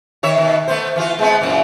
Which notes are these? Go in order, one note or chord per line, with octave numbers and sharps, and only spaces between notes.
D#3 C#5 E5
B2 D#3
A3 B3 C5
E3 F4 F#4
G#3 B3 C4
F#2 A#2 E3